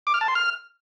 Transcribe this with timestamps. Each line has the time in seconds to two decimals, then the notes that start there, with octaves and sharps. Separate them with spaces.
0.07 D6
0.14 F6
0.21 A5
0.28 C6
0.35 F6